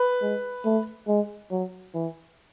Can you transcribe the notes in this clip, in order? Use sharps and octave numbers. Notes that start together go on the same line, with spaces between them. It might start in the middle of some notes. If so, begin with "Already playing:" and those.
Already playing: B4
G#3
A3
G#3
F#3
E3